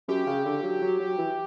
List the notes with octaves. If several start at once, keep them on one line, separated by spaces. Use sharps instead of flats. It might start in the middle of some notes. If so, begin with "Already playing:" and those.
F#2 G4
C#3
D3
F#3
F#3
F#3
E3